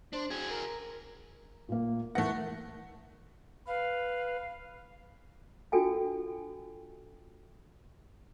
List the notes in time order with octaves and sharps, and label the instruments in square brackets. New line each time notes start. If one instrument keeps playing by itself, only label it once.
[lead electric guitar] D4 [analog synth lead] C5
[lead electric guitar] F#4 G#4 [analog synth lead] G#6
[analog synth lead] A#4
[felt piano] A#2 A#3
[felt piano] E2 A#4 A#6 [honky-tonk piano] A3 F#5
[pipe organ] B4 [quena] F5
[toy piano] D4 F4 F#4 A4 G5 G#5